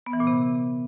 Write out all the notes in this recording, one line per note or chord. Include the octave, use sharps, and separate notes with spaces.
B3
E3
A#2
C3